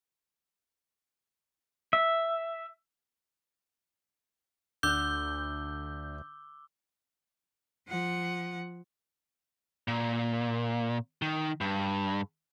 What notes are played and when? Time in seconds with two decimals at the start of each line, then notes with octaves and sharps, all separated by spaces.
1.93 E5
4.83 D2 D3 D6 E6 F#6 G6 G7
7.88 F3 F#5
9.88 A#2
11.22 D#3
11.61 G2